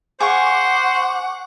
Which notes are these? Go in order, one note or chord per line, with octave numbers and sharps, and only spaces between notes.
G#4 C5 F5 F#5 C#6 D6